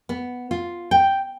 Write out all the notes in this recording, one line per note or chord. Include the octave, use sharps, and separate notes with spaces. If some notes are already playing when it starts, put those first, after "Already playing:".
B3
F4
G5